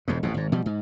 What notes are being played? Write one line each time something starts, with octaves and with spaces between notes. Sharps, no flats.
E1 F2 G#2
A1 F2 B2
G#1 G#2
B2 F3 G3
G#2